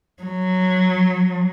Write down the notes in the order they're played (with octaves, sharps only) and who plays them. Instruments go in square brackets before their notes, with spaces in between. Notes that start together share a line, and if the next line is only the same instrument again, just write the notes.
[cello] F#3